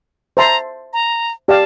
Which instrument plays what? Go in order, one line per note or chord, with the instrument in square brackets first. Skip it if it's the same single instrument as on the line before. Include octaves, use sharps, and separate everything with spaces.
[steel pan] C5 E5 A5 C6 [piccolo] A#5
[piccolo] A#5
[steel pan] G4 D5 F5 [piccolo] A5